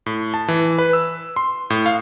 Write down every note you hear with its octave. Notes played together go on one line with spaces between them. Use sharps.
A2
A5
E3
B4
E6
C6
A2
F5